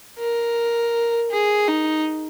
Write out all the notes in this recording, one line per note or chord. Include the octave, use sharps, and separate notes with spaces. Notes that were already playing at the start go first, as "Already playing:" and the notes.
A#4
G#4
D#4